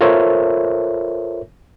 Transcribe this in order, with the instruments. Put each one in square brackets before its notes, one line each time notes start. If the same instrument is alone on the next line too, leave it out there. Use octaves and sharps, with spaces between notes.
[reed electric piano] F4 A4 A#4 C5 C#5 E5